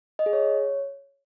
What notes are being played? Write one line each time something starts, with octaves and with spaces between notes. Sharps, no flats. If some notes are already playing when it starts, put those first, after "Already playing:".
D#5
G#4
C#5